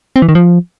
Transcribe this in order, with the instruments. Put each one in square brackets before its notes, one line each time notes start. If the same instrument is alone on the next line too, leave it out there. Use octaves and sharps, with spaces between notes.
[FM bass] C4
E3
D#3
F3